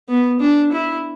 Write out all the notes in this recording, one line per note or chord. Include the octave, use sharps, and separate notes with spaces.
B3
D4
E4